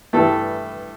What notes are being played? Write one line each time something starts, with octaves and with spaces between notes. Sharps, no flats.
G2 E3 A3 A4